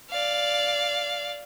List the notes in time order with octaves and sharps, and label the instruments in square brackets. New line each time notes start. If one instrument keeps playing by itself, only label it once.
[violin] D5 F5